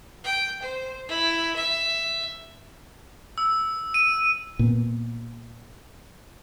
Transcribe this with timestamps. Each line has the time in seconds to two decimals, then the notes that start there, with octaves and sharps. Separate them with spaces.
0.24 G5
0.62 C5
1.09 E4
1.56 E5
3.38 E6
3.94 D#7
4.59 A#2 B3